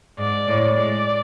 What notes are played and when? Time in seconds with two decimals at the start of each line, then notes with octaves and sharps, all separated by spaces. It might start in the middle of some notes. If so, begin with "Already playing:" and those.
0.19 G#2 D5
0.48 A2
0.76 G#3 D5